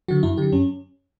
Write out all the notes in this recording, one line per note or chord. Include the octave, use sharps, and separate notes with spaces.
D3 F#3 F#4
F#2 E4
D3 F#3 G4
F#2 C#4